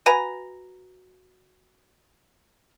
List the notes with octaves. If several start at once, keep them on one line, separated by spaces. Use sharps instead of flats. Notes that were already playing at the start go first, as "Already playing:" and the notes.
F#4 B4 G#5 A#5